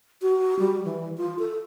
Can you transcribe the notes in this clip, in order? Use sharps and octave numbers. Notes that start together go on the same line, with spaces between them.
F#4
G3
E3
F4
A4